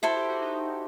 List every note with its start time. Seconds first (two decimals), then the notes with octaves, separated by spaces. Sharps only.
0.02 E4 F#4 A4 C5
0.15 G4
0.28 F#4
0.40 D#4